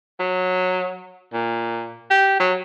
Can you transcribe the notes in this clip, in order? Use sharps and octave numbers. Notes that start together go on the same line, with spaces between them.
F#3
A#2
G4
F#3